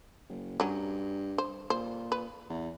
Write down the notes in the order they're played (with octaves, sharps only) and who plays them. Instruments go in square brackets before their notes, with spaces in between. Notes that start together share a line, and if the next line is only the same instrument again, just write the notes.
[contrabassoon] F#1
[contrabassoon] G2 [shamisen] F#3 C#4
[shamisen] C5
[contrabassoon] A#2 [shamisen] C5
[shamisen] B4
[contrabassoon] E2